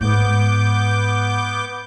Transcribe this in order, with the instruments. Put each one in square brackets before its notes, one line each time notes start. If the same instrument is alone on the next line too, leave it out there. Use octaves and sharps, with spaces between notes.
[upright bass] G#2 [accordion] B3 D6 G6